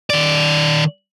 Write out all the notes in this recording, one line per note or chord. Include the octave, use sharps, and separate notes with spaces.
D#3 D5